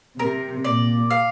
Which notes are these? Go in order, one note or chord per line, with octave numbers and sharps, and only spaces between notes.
C3 A#4
A#2 D5
F5